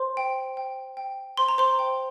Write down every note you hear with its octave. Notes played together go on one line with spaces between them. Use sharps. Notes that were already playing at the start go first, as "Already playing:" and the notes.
Already playing: C5 C6
G5
G5
G5
C5 C6
A#5
C5 C6
G5